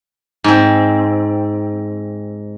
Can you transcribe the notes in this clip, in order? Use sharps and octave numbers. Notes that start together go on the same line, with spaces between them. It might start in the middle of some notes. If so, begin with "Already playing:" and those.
G#2 C4